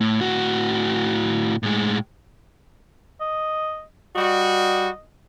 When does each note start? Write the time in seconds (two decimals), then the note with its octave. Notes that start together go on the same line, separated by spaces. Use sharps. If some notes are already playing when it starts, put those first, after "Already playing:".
0.01 A2
0.21 A2 F#4
1.63 A2 G#3
3.21 D#5
4.16 G3 F#4 D#5